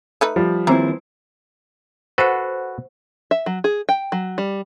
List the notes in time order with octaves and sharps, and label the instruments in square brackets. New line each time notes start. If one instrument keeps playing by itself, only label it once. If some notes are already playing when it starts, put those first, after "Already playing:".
[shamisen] A3 D#4 B4
[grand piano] F3 G3
[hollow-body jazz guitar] D#2 C4 E4 [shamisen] E3 A#5
[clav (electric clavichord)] F#4 A4 B4 [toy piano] C5 F#5
[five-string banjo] E5
F#3
G#4
G5
F#3
G3